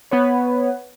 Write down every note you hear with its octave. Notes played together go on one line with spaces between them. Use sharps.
B3 B4 C#5